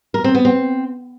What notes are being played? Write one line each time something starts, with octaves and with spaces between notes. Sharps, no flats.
A#4
C4
B3
C4